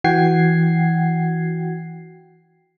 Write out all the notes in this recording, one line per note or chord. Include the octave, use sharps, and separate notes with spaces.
E3 F#4 F#5 G5 G#6 C7